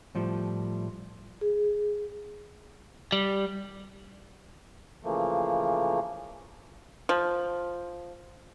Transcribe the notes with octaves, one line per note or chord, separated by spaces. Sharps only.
A2 F3 G3
G#4
G3
C#3 E3 F3 A3 A#3
F3